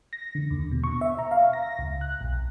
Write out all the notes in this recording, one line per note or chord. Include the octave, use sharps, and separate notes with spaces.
A#6
D3
D#2
B2
C#6
E5
A#5
F5
A#6
C#2
F#6
B1